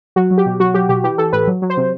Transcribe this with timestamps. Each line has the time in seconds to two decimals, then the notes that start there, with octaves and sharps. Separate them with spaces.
0.16 F#3 F#4
0.31 F#3
0.38 G4
0.46 B2
0.60 F#3 F#4
0.74 F#3 G4
0.89 B2 G4
1.04 E3 G4
1.18 E3 A4
1.33 A2 B4
1.48 F#3
1.62 F#3
1.70 C5
1.77 C3